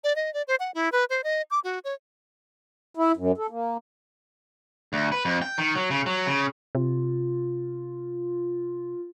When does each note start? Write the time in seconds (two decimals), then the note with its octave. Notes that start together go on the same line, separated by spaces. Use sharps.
0.04 D5
0.16 D#5
0.34 D5
0.48 C5
0.60 F#5
0.74 E4
0.92 B4
1.10 C5
1.24 D#5
1.51 D6
1.64 F#4
1.84 C#5
2.95 E4
3.17 F#2
3.38 A4
3.50 A#3
4.93 D2
5.12 B4
5.25 F2
5.42 G5
5.58 D#3
5.75 F#3
5.90 C#3
6.06 F#3
6.27 C#3
6.75 C3 F4